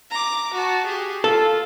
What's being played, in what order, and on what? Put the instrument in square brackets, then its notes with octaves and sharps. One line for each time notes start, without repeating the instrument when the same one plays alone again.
[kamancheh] A#5 D6
F#4 A5
G4 G#4
[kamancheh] F4 [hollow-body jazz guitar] A4